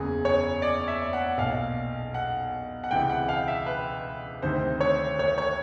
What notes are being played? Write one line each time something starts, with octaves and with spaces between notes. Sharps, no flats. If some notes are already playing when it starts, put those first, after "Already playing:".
Already playing: F#1 E2 C#3 G#4
C#5
D5
E5
F#5
B1 A#2 F5
F#5
F#5
C#2 C3 E3 G5
F#5
F5
E5
B4
D2 C3 D#3 C5
C#5
C#5
C#5